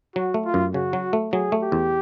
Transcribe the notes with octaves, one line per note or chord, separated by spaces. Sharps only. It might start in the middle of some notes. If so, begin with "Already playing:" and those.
F#3 F#4
A3
F4
F#2
C#3 F#4
F#3
A3
F#3 G#4
A3
G4
E2